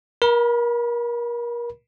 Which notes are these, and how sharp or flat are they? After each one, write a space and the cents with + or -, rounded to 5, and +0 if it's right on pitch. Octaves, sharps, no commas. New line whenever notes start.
A#4 +30 B5 -25